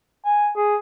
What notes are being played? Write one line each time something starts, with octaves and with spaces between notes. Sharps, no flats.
G#5
G#4